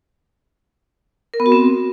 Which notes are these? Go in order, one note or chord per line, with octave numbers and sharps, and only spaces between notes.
A#4
B3
F#4
C4